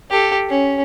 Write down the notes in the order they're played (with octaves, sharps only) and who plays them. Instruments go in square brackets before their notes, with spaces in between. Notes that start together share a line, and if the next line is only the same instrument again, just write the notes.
[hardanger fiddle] G4 A4
C#4